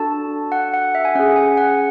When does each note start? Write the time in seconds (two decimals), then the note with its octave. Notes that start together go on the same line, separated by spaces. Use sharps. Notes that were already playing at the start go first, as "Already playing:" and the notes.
Already playing: D4 F#4 A4 A5
0.52 F#5
0.74 F#5
0.95 E5
1.05 G#5
1.15 C#4 G#4 F#5
1.36 G#5
1.57 F#5